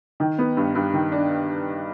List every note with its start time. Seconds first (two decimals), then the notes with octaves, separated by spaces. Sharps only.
0.20 D#3
0.38 B3
0.57 G2
0.75 G2
0.94 D#3
1.12 D4